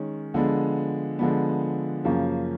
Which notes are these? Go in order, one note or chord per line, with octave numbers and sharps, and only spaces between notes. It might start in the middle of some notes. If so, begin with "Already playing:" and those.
Already playing: D#3 G#3 C#4
D3 F3 G#3 B3
D3 F3 G#3 B3
F#2 C#3 F3 A#3